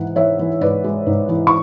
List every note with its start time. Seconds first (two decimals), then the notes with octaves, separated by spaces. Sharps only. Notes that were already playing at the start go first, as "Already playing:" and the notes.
Already playing: G#2 E3 F#5
0.16 E3 C#5 E5
0.39 E3
0.61 G#2 B4 D5
0.84 G#3
1.07 G#2
1.29 E3
1.47 C#6